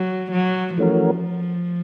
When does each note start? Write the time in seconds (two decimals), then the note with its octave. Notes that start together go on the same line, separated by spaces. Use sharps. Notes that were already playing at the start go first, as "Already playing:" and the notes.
Already playing: F#3
0.31 F#3
0.78 E3 F3 A3 C#4 F#4 A#4